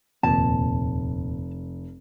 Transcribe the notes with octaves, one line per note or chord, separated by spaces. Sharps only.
F1 D#2 A#2 A5